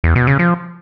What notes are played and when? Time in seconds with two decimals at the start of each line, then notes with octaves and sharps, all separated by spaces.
0.04 E2
0.15 B2
0.27 C#3
0.39 F3